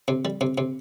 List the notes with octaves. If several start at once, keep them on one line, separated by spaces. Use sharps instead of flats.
C3
G3
C3
C3